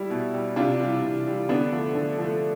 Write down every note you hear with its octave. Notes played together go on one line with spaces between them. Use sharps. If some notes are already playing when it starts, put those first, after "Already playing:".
Already playing: G3 E4
B2
G3
C3 D4 F4
E3 G3
C3
E3 G3
D3 B3 D4
F3 A3
D3
F3 A3